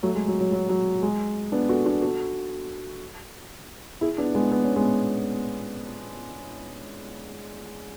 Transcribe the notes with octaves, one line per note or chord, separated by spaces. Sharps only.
F#3 A3
G#3
F#3
F#3
F#3
F#3
G#3
B3 D4
F#4 A4
D4 F#4
F#4 A4
E4 G#4
B3 D4
G#3 B3
B3
C#4
G#3 B3